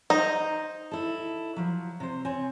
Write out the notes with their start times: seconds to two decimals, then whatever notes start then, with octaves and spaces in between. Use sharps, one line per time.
0.10 D#4 C5 A#5
0.91 E4 A4
1.56 F3 F#3
2.00 C3 C5
2.25 C4 C#5 G#5